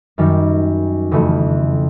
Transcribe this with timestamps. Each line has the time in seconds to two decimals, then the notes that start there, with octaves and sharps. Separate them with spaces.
0.18 F#2 D#3 G3
1.11 F2 C#3 E3 A3